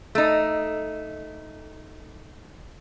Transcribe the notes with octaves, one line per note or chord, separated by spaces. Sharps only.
A3 D#4